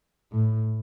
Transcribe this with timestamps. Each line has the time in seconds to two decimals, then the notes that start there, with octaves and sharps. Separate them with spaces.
0.32 A2